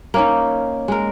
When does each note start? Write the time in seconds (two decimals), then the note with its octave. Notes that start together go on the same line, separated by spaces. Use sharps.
0.14 A#3 C#4 D#4
0.88 G#3 A#4